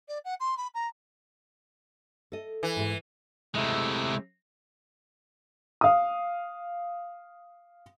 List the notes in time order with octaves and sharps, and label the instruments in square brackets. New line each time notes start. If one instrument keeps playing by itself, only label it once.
[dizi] D5
F#5
C6
B5
A#5
[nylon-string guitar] A4 D#5
[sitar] E3
[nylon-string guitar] G#2 E4 G#4
[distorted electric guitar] C3 G#3 [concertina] A3 E4
[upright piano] F5 D#6